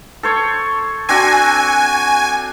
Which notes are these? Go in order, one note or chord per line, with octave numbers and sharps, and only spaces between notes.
A4 C5 C#5
C4 D4 F#4 G#5